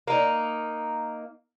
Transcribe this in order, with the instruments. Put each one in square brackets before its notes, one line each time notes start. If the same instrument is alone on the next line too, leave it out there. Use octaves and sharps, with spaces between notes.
[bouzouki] A#3 D#4